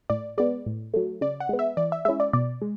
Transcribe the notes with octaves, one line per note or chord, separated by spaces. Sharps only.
A2 D5
G#3 B3 D5
A2
F#3 A3
C#3 D5
F#5
G#3 B3
E5
E3 D5
E5
G#3 C#4 E4 E5
D5
B2 D5
G#3